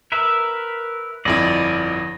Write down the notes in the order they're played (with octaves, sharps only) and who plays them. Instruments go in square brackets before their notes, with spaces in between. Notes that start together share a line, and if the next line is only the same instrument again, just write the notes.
[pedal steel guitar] A#4 B4 E5
[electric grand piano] G1 F2 E4 [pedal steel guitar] D5 D#5